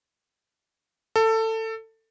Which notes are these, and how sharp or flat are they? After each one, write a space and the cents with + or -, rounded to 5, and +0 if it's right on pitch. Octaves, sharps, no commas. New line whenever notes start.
A4 +20